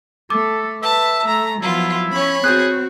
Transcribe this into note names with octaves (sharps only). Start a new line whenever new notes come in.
A3 A4 D6
B4 E5 A5
A3 A#5
F3 F#3 B3 E4 F4
C#4 C#5 B5
C4 F#4 G#4 F#6 G6